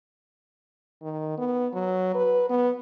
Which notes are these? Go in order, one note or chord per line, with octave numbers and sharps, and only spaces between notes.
D#3
B3
F#3
B4
B3